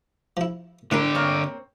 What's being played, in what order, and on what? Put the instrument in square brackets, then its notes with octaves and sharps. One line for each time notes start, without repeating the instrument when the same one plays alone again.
[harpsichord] F3 E4
[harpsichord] A2 A#4 B5 [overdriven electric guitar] D3 G4 [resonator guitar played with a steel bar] D4
[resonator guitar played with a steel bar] A#3 C4 C#5